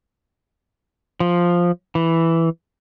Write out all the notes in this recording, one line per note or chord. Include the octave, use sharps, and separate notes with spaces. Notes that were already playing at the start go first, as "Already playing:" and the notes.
F3
E3